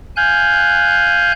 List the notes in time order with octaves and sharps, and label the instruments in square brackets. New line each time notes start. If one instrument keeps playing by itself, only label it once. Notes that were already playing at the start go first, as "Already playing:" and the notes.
[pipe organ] F5 G#5 F#6 G6